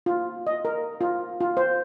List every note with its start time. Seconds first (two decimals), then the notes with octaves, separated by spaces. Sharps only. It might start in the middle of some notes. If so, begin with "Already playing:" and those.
0.06 F4
0.47 D#5
0.65 A#4
1.01 F4
1.40 F4
1.57 C5